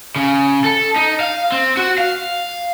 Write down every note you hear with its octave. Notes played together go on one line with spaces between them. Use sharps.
C#3
A4
D#4
F5
C4
F#4
F5